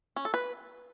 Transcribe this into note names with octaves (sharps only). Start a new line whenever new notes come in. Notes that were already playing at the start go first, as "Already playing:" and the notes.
C#4
A4
B4